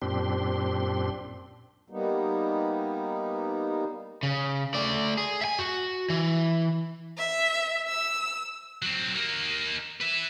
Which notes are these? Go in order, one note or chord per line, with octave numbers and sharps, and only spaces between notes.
F#2 A#2 C4 D4 G4 C6
G3 A#3 B3 D#4
C#3
A3 D5
G#4
E5 G#5
F#4
E3
E5
E6
F#3 C4
A#3 D#4
B4 E5